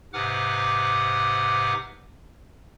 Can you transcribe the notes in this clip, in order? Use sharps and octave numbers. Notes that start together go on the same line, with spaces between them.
G#2 C3 B4 F#5 D6 F6